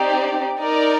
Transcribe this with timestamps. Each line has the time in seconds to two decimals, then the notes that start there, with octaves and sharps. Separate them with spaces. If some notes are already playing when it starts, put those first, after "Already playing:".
Already playing: C4 D#4 G4 D5
0.59 D#4 A#4 D5